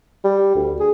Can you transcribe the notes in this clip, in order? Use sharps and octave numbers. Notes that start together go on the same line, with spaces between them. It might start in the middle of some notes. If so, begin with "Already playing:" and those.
G3
D2
G#4